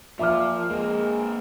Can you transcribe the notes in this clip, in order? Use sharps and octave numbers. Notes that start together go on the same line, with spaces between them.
A#2 F3 E5 D6 F6
G#3 A#3 C4 A#4